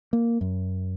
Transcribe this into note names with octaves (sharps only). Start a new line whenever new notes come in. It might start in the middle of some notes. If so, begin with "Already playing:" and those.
A#3
F#2